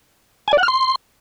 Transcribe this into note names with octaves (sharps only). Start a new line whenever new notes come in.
G#5
D5
F#5
F6
C6